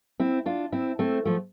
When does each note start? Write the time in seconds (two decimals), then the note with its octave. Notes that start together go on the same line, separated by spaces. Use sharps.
0.20 C4 E4
0.46 D4 F4
0.72 C4 E4
0.99 A3 C4
1.25 F3 A3